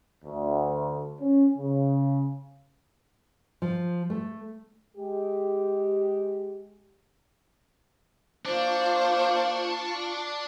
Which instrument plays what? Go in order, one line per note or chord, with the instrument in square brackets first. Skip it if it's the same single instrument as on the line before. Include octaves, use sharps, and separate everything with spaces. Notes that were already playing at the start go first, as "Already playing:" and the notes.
[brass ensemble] D2
C#4
C#3
[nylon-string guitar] F3
A3
[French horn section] G#3 G4
[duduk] A#3 [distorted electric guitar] D4 [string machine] F4 C#6 [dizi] C5